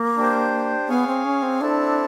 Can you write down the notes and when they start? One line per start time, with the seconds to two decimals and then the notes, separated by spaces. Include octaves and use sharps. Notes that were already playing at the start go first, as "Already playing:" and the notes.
Already playing: A#3
0.17 D4 G4 C5
0.89 B3 G#4 C#5 F5 G#5
1.07 C4
1.25 C#4
1.42 C4
1.61 C4 D4 E4 A4